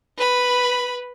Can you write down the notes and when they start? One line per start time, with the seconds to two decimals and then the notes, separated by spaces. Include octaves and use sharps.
0.18 B4 B5